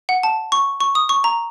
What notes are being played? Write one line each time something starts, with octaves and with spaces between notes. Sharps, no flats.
F#5
A5
C#6
C#6
D#6
C#6
A#5